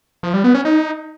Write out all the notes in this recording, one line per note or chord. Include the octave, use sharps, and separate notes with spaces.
F3
G3
B3
C#4
D#4